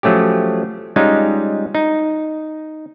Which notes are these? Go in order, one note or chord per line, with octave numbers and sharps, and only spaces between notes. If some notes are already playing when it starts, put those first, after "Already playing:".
F3 F#3 A3 C#4 G4
G3 G#3 C#4 D#4 F4
D#4